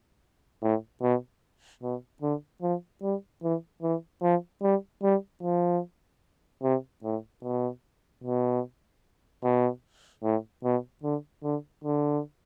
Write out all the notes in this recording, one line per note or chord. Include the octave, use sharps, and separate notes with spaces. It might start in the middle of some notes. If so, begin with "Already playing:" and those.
A2
B2
B2
D3
F3
G3
E3
E3
F3
G3
G3
F3
C3
A2
B2
B2
B2
A2
B2
D3
D3
D3